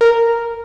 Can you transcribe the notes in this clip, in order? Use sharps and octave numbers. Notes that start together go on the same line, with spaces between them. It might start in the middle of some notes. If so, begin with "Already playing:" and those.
A#4